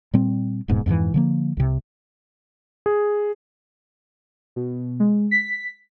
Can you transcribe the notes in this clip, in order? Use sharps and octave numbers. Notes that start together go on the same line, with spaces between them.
A#2 G3 C4
D#1 F2 G#2 B2
F2 G#2 C3 E3
D3 F3 A#3
C2 C3
G#4
B2
G#3
B6